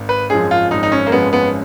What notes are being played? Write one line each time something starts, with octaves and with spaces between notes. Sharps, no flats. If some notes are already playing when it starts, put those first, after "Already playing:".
Already playing: G#1
B4
F#2 F3 G#3 C#4 G#4
F4
G#1 D#4
D#4
C#4
A#3
F#2 F3 G#3 B3 C#4
B3